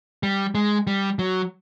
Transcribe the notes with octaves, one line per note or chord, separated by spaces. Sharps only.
G3
G#3
G3
F#3